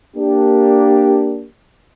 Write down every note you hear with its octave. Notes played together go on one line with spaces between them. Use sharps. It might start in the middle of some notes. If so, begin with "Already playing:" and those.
A#3 D4 G4